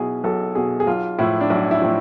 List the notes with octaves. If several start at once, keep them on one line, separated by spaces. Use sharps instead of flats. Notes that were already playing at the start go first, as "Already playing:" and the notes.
Already playing: B1 B2 E4 G#4
B1 A4
B2 G#4
G#4
B1 F4
A2 F3 E4
D4
B1 E4
E4
A2 F3